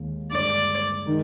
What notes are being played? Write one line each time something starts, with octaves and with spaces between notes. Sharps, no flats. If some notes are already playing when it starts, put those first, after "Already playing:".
Already playing: D#2 D#3 G#3
G2 D3 G#3 D5
D#3 G#3 D#4 A#4